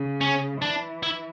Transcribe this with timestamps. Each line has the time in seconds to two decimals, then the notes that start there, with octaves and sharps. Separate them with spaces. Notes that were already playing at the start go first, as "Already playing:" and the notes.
Already playing: C#3
0.21 C#4
0.62 E3 D4
1.03 E4